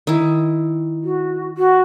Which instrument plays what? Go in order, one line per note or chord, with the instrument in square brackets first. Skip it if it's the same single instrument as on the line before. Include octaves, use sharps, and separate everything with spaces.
[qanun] D#3 E4
[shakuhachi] F#4
F#4